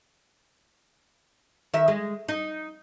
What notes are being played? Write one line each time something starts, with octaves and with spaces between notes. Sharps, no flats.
D#3 E5
G#3
D#4